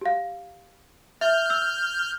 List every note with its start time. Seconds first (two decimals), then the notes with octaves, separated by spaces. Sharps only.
0.01 G4 F5
1.21 E5 F6 G6
1.50 E6